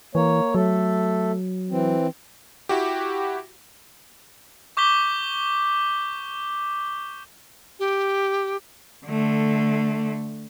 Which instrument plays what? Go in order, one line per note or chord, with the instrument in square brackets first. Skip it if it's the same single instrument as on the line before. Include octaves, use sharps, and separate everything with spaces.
[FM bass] E3 [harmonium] A#3 C#5
[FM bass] F#3 [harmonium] A3 A4
[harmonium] E3 C4
[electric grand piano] E4 F#4 G4
[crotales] C#6 D6 G6 B6 G7
[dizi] G4
[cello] D3 A3